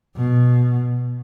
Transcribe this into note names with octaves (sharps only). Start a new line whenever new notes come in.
B2